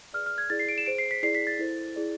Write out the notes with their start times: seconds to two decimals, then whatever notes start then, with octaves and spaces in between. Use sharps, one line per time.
0.13 G#4 B4 D5 F6
0.26 F6
0.38 G#6
0.50 E4 G#4 D5 A6
0.59 C7
0.69 D7
0.78 E7
0.86 G#4 C5 D7
0.98 C7
1.11 B6
1.23 E4 G#4 D5 C7
1.35 B6
1.47 A6
1.59 E4 A4 C5
1.96 E4 G#4 D5